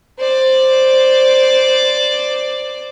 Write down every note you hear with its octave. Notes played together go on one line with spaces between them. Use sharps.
C5 D5